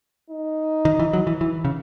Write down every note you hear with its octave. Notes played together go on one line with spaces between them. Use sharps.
D#4
D#3
E3
F#3
E3
E3
C#3